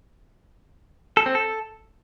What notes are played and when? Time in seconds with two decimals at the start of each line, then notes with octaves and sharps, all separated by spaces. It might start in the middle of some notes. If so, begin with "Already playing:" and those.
1.17 A4
1.26 C4
1.35 A4